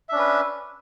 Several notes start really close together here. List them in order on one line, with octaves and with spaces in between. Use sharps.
E5 D4 C#4 B4